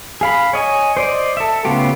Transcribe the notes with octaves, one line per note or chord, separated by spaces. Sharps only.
G#4 F5 B5
C#5 D#5 G#5
C5 D5 D#5
A4 E5
C#3 A3 B3 F4 G4